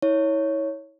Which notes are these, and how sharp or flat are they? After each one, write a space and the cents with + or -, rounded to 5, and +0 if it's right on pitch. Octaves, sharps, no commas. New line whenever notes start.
E4 -35 C#5 +0